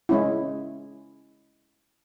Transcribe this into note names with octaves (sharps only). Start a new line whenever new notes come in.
G#3 C#4 E4